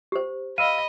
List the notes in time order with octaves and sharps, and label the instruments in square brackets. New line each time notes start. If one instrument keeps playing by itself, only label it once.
[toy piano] G4 C5
[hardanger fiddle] D#5 B5 [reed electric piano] F5 E6 [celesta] D#7